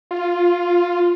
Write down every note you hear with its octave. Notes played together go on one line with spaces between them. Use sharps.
F4